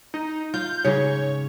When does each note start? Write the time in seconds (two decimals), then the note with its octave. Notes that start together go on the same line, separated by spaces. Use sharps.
0.14 D#4
0.54 F4 G6
0.84 G#2 C#3 C#5